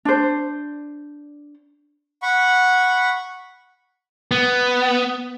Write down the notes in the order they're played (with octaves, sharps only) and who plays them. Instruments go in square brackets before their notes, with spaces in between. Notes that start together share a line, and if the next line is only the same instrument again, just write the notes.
[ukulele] D4 C5
[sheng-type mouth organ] F#5 B5 C#6
[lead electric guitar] B3